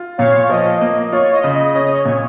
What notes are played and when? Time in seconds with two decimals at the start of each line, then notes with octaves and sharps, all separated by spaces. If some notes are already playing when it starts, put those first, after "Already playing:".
Already playing: F4
0.18 A#2 C#5 F5
0.49 F3 D#5
0.81 A#3
1.12 F4 C#5
1.32 D#5
1.44 C#3
1.54 D#5
1.74 C#4 D#5
1.90 C#5
2.05 A#2 C#5